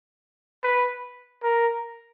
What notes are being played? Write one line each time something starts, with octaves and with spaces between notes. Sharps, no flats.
B4
A#4